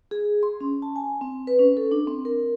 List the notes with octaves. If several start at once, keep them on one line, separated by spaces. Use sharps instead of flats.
G#4
C6
C#4
A5
G#5
C4
B4
C#4
A4
D4
C4
A#4